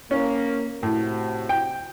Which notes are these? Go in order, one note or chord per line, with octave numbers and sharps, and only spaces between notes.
A#3 C#4
A2 C3 F#4
G5